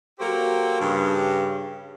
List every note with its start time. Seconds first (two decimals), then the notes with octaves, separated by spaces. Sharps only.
0.20 F#3 A#3 F#4 G4 A4 C5
0.80 G2 C#3